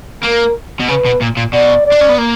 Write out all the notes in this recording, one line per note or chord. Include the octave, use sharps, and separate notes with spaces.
A#3 A#4
B2
C#3 B4
B2
A#2
A#2
B2 D5
D5
D4
C#4
B3
A#3